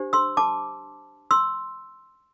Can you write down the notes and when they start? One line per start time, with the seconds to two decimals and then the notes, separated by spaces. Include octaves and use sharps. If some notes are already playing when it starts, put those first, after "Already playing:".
Already playing: D4 G4 C5
0.13 C6 E6
0.37 A5 D6
1.31 C6 E6